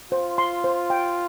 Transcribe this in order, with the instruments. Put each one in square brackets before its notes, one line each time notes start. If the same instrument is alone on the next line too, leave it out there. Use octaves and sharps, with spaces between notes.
[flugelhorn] F4 [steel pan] C5
[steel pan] C6
C5
G5